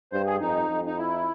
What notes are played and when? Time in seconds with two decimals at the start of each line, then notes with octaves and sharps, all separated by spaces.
0.12 G2 C5
0.27 G#4
0.41 F2 D#4
0.69 F2
0.86 D#4
0.98 E4